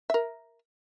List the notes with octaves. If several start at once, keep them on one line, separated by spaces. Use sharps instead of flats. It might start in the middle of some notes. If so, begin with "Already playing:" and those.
A#4 E5